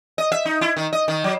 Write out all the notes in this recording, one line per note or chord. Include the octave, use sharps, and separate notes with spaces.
D#5
E5
D#4
E4
D#3
D#5
D#3
F#3